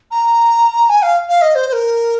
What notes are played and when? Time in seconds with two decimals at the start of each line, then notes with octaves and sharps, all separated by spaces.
0.11 A#5
0.89 G#5
1.02 F5
1.28 F5
1.41 D#5
1.55 C5
1.68 C5
1.72 A#4